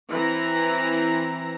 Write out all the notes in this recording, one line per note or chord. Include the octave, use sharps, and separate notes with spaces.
E3 C4 A#5